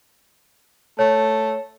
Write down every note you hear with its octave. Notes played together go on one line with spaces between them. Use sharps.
A3 C#5